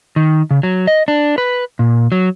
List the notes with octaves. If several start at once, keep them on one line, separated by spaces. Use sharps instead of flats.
D#3
C#3
F#3
D#5
D4
B4
A#2
F#3